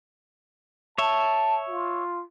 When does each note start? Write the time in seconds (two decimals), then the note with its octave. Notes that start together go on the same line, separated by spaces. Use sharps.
0.98 C#5 E5 A5
1.69 F4